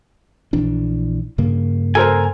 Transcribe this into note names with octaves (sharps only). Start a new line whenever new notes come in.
A#1 E3 D4
G2 C#3 A#3
A4 A#4 C5 G#5